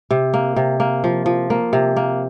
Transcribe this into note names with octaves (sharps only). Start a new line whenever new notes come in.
C3
A#3
C3
A#3
F3
F3
A#3
C3
A#3